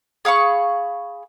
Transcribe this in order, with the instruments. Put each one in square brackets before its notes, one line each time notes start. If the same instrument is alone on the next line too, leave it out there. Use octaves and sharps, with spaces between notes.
[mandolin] G#4 F5 B5 C#6